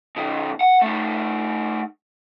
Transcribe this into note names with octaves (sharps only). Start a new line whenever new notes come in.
B2 D#3
F#5
A3 D#4